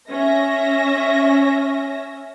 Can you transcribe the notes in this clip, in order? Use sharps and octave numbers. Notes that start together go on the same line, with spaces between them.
C#4 E5 A#6